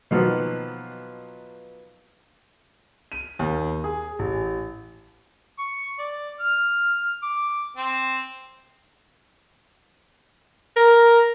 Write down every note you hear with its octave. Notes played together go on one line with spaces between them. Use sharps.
B2 D#3 F3 F#3 A#3 B3
D#7
D#2
G#4
A1
C#6
D5
F6
D6
C4
A#4